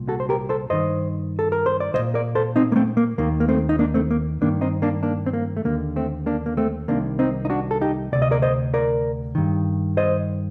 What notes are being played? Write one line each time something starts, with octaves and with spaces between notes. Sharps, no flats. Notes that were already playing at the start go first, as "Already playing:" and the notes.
Already playing: C2 A#2
F#4 A4
C5
G4 A#4
A4 C5
G2 D#3 C5 D#5
A4
A#4
C5
D5
C2 C5 D#5
A#2
A#4 D5
A4 C5
C4 D#4
A#3
A3 C4
A#3
D#2 D#3 A#3
A#3
A3 C4
D#4
A#3 D4
A3 C4
A#3
G2 D#3 A#3 D4
C4 D#4
A#3 D4
A#3 D4
C4
A#3
A3
D#2 D3 A#3
A3 C4
A#3 D4
A#3
A3 C4
C2 C3 D#3 A#3 D4
C4 D#4
D#4
D4 F#4
A4
D#4 G4
D2 C3 D5
D#5
A#4 D5
C5 D#5
A#4 D5
G2 D#3
C5 D#5